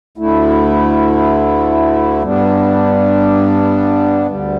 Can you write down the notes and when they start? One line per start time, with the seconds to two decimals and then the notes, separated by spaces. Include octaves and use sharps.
0.18 D2 D3 A3 E4
2.22 G2 G3 B3 D4
4.26 D2 D3 G3